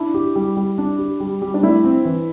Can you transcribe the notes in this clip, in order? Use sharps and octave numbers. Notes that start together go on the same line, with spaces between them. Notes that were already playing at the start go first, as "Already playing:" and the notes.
Already playing: D4 E4
G4
G3
G3
D4
G4
G3
G3
D4
A3 E4
C4
E3